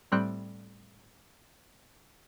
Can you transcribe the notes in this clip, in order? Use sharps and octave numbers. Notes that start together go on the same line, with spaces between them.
A2 G3 C4 G5 F#6